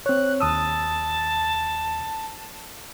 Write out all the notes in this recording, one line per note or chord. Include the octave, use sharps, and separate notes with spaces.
C4 C#5 F#6
D#2 A5 D#6 E6